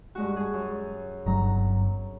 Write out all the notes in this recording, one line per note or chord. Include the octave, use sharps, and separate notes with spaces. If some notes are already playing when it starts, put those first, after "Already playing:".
G2 G#3 F#4
G#4
F#2
G1 F#3 A#5